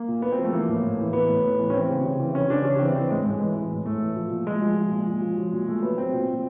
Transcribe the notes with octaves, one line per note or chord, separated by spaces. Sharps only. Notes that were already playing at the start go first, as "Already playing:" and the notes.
Already playing: A#3
A#2
A#2 B3
C4
F3 A3
E3 A#3
A2
A2
E3
E3 B3
A2
A2
E3
C#4
E3 C4
C#3
C#3
E3
E3 C#4
C#3 D4
C#3 C#4
E3 C4
E3 C4
A2 G#3
A2 G#3
E3
E3
A2
A2 A3
E3
F3
A#2
A#2 G#3
F3
F3
A#2
A#2
F3
F#3
A#2
A#2 A3
F#3 B3
F#3 C4
A#2
A#2